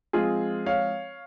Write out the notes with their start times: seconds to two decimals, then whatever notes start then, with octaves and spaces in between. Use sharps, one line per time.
0.13 F3 G#3 C4 F4 G#4
0.66 C#5 F5